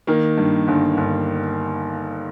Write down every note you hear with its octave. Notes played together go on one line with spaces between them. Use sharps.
D#3 A#3
G2
G1
G1